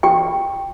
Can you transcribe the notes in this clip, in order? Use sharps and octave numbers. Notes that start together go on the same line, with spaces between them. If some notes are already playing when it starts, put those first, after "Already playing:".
G4 G5